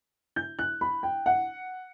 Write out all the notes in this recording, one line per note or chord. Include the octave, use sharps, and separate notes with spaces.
G6
F#6
B5
G5
F#5